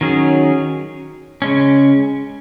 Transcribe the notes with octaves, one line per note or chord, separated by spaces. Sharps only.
D#3 F#3 C#4 G#4
C#3 G#3 C#4